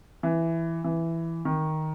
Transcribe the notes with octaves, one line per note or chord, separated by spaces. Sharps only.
E3
E3
D#3